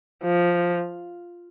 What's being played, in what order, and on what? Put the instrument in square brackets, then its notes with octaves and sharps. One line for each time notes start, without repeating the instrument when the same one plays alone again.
[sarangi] F3